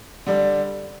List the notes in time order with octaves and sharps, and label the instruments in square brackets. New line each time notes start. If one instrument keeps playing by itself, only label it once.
[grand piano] D3 G3 D4